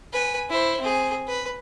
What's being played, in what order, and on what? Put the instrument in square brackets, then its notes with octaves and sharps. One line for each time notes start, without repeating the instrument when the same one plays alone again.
[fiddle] B4 G#5
E4 C5
C4 G#4
B4